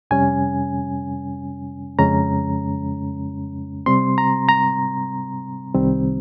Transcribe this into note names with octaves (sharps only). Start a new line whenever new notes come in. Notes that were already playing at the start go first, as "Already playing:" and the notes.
F2 C3 G3 C#4 G#5
F2 C#3 G#3 C#4 A#5
C3 G3 C4 C6
A#5
A#5
C2 C3 D#3 G3 C4